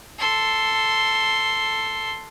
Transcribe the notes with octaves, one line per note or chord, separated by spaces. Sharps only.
A4 C6